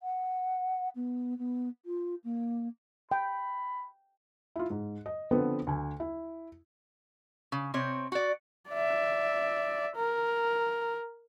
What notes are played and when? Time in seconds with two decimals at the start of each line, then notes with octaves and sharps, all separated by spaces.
0.01 F#5
0.95 B3
1.38 B3
1.85 F4
2.24 A#3
3.12 G5 B5
4.56 E4 F4
4.70 G#2
5.06 D#5
5.31 D3 F3 B3 C4 A4 B4
5.67 D2 G#5
6.00 E4
7.52 C#3
7.74 C3 C4 C#5
8.12 F#4 D5
8.69 D5 E5
9.96 A#4